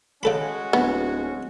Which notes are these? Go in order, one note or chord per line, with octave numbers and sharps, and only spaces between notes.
C#3 G#3 C#4 F#4 A4 B5
D1 B3